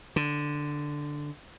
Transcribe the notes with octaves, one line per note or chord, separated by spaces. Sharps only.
D3